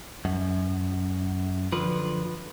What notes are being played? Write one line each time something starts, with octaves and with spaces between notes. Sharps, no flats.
F#2
D3 F3 B4